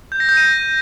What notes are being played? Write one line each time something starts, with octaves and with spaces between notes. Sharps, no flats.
G6
A#6
G6
D#7